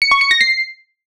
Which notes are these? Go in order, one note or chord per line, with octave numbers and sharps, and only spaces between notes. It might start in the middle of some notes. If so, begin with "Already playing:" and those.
C#7
C#6
C#7
A#6
C7